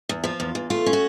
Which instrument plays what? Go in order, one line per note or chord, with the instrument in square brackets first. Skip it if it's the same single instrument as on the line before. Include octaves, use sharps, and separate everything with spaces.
[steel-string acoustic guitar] E2
F3 F4
E2
E2
A3 F4
C#4
F#4